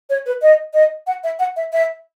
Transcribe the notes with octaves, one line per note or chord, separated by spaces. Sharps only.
C#5
B4
D#5
D#5
F#5
E5
F#5
E5
E5